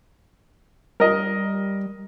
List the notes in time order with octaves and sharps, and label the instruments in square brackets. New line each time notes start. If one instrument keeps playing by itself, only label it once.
[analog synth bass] G3 [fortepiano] A#4 D#5